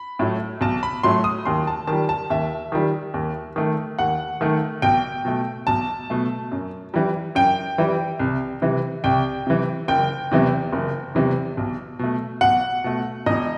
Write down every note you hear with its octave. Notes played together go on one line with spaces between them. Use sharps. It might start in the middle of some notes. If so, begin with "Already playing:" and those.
Already playing: B5
A2 F#3 A3
B1 A5
B5
A2 F#3 A3 C6
D#6
D#2 C6
A5
D#3 A5
G3
A5
D#2 E5
D#3 G3
D#2
D#3 A3
D#2 F#5
D#3 A3
B1 G5
B2 A3
B1 A5
B2 A3
F#2
E3 G3
F#2 G5
E3 G3
C2
C3 E3
C2 G5
C3 E3
F#1 G5
E2 C3 E3
F#1
E2 C3 E3
B1
B2 A3
B1 F#5
B2 A3
E1 D#5